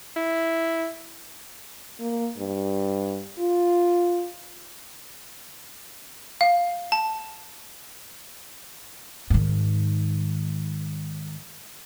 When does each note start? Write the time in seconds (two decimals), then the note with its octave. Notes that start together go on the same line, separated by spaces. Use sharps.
0.16 E4
2.00 A#3
2.38 G2
3.39 F4
6.41 F5
6.92 A5
9.30 G#2 D#3